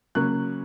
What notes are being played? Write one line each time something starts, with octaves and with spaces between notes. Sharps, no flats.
C#3 F#3 A#3 C#4 F#6